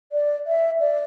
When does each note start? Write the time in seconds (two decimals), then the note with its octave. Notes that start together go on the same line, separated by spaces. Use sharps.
0.12 D5
0.46 E5
0.80 D5